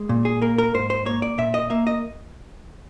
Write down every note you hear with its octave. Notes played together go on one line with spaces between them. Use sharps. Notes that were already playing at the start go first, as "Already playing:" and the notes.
Already playing: G#3
A#2
G#4
A#3 A#4
A#4
G#2 C5
C5
A#3 C#5
D5
A#2 E5
D#5
A#3 E5
D#5